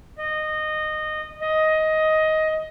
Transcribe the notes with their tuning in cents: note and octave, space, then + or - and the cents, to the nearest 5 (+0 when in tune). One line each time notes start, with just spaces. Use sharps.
D#5 -15
D#5 +15